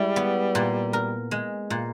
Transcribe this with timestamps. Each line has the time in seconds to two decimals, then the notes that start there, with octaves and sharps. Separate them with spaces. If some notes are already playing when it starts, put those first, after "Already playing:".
Already playing: G3 G#3 E4
0.16 B3
0.55 A#2
0.93 A#4
1.31 G#3
1.70 A#2